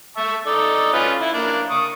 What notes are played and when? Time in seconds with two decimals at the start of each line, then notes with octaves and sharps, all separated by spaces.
0.17 E5 A5 C#6
0.46 D#4 A4 D5
0.93 C#4 F4 B4
1.21 E4
1.34 A#3 D4 F5
1.70 C#6 D#6